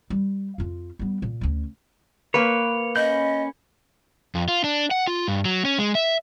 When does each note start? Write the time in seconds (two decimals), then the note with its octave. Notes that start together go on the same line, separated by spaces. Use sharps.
0.10 G3
0.58 F2 F4
0.99 G3 B3
1.22 A#2
1.41 D2 C#4
2.34 A#3 B4 C#5
2.96 C#4 D#5 B5 G6
4.35 F2
4.48 F4
4.64 D4
4.91 F#5
5.07 F4
5.28 G2
5.45 F#3
5.65 C#4
5.79 G#3
5.95 E5